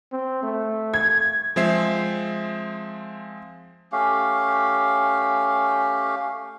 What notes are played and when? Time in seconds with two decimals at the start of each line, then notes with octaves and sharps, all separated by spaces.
0.12 C4
0.43 A3
0.94 G#6
1.56 F3 G#3 C4 C5 E5 C7
3.92 A3 C#4 G4 F5